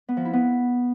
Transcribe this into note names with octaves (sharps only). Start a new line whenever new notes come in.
B3
F3
E4
B3